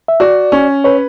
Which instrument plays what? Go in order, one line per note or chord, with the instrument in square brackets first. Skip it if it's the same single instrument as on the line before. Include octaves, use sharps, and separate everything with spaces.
[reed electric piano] E5
[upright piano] F#4 [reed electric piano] D5
[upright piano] C#4
[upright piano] B4 [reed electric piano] C#5